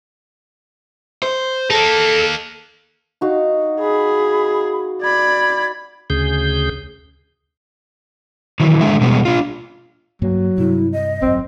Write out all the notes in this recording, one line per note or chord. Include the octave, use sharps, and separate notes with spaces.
C5
A#3 D#4 A4
D#4 F#4 F5
G#4 B5
D5 B5 G#6
D2 C#3 G#4 G6
D#3 E3 F#3
D3 G#3 E5
B2 G3 G#3 B3
D4 F4
G2 F#3 A#3
G2 C3 E4
D#5
G#1 F#2 C4